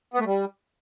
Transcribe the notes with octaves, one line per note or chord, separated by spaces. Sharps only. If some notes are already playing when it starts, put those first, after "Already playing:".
B3
A3
G3